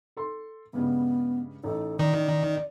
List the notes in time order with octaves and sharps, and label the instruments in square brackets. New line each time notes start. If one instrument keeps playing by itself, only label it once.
[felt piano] A4 C6
[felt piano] G2 C#3 G#3 [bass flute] B3
[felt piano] A1 D#4 [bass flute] A4
[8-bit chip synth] D#3 [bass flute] D5